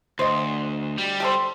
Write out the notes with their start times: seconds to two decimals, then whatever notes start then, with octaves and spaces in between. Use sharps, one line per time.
0.19 D2 C5 D#5
0.98 G3
1.20 G4 A4 C5